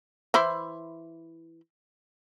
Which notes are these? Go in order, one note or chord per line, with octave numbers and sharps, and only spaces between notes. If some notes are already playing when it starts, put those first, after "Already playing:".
E3 E4 C5